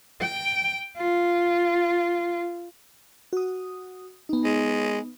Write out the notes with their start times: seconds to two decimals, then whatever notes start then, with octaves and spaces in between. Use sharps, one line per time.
0.21 G5
0.98 F4
3.33 F#4 D#6
4.29 B3 D#4
4.44 G#3